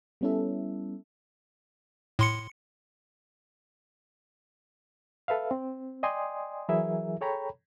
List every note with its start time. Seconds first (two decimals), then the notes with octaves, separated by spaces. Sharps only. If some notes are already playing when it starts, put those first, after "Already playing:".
0.21 G3 B3 C#4 E4 A4 E5
2.19 A2 C6 C#7
5.28 A4 B4 E5 F5
5.51 C4
6.03 D5 D#5 G5 G#5 C6 D#6
6.69 E3 F#3 E4 G#4 A#4 E5
7.21 G#4 A4 C#5 G5 A#5 B5